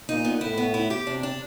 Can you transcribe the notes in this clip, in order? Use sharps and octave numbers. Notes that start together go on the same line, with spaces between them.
A#2 D#4
B3
A2 E4
B3
E4
G4
C3 D4
D4